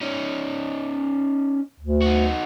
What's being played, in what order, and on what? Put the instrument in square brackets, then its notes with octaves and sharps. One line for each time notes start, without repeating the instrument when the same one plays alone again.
[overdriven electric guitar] C#4 D#4
[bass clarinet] D2
[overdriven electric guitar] D#4 F#4